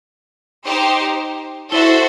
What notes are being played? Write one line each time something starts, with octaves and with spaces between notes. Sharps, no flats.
D#4 G4 C5
E4 F#4 A4 C5 E5